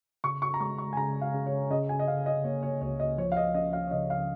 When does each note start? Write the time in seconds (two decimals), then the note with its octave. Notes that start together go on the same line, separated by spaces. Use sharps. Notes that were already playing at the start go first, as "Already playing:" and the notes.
0.24 C#3 C#6
0.42 C#6
0.54 A#5
0.60 G#3 C#6
0.78 C#6
0.93 G#5
0.97 C#3 A#5
1.21 F5
1.34 C#3
1.46 C#5
1.70 C#3 D#5
1.89 G#5
1.99 D#5
2.07 C#4 F5
2.26 D#5
2.44 A#3 C#5
2.63 C#5
2.81 C#2 C#5
3.00 D#5
3.18 F3 C#5
3.32 F5
3.37 D#5
3.55 C#4 D#5
3.73 F5
3.87 C#5
3.91 C#3 D#5
4.10 F5